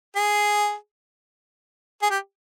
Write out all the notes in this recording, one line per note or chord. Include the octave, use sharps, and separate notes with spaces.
G#4
G#4
G4